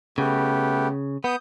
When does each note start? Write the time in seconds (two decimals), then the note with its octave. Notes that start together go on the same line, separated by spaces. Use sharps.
0.18 C#3 A3 B3 G4
1.24 B3 D#6 G6